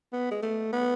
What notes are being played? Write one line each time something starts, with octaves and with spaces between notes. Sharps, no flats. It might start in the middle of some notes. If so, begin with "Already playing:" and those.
B3
G#3
A3
B3